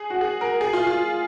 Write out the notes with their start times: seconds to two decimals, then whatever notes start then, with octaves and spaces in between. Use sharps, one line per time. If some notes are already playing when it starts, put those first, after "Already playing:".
Already playing: G#4
0.10 F#4
0.21 G#4
0.41 A#4
0.61 G#4
0.73 F4
0.87 F4